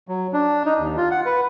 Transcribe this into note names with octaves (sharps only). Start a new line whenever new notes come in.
F#3
D4
D#4
D#2
F4
F#5
B4